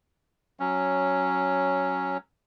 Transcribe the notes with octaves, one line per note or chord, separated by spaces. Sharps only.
F#3 C#4